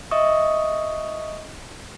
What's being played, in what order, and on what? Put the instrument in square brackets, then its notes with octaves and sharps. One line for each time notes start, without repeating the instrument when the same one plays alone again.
[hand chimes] D#5 E5 C#6 D#6